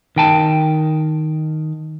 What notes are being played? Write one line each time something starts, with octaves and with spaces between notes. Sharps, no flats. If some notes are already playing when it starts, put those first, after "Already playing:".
D#3 G5 A5